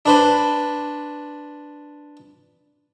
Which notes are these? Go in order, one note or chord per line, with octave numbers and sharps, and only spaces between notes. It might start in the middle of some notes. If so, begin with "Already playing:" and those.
D4 B4 C5